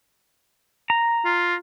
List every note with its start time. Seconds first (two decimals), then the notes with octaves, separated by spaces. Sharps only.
0.90 A#5
1.25 F4